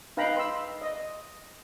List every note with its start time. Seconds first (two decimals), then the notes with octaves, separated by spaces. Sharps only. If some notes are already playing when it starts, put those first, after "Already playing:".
0.17 D#4 B4 F5 G5 A#5 B5
0.36 C6 E6
0.82 D#5